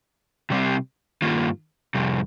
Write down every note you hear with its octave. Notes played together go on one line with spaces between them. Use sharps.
C3 G3 C4
G2 D#3 A#3 F4
F2 C3 G3